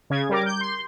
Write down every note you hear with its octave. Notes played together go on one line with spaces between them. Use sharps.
C#3 G#6
G3 A#4 D6
G6
C6